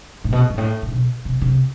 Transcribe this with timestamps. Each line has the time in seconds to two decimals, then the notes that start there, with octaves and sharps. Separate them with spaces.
0.24 A2
0.32 B2
0.50 G2
0.58 A2
0.82 A2
0.92 B2
1.25 C3
1.41 C3